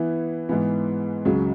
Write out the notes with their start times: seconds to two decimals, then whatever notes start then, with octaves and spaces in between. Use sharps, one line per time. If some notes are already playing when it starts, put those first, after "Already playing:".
Already playing: E3 B3 E4 B4
0.49 G#2 E3 B3
1.25 C#2 C#3 F#3